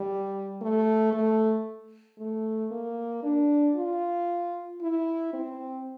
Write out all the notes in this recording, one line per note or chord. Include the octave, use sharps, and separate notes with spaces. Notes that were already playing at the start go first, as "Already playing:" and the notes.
Already playing: G3
A3
A3
A3
A#3
D4
F4
E4
C4